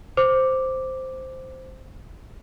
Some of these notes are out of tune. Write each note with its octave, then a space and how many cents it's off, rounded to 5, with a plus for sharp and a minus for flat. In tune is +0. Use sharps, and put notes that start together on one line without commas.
C5 +0 D6 +0